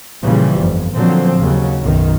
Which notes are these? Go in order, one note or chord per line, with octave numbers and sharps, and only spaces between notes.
A#2 C#3 E3 F3 G3
G1 F2
A#2 D3 F3 F#3 C4
D#2 C#3 F#3
B1 F#2 D#3